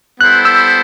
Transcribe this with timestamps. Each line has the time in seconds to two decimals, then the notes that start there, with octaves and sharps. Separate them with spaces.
0.21 G3 B3 E4 A4 C5 F#6
0.45 E6